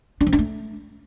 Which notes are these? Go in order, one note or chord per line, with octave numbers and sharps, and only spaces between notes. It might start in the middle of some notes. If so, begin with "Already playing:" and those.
D4
F3
D4
A3